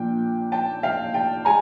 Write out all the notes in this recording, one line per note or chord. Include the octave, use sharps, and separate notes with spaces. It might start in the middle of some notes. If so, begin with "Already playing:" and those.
Already playing: A#2 F3 A#3 D4 G5
G5 A5
F5 G5
G5 A5
G#3 G#5 A#5